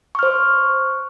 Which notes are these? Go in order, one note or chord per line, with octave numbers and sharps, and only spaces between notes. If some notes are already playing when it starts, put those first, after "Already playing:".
C5 C#6 F6